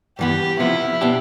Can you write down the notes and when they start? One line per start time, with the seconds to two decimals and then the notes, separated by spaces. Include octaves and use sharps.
0.19 G2 E3 B3 G4
0.59 C3 F3 B3 E4 F4
1.01 B2 B3 D4 G4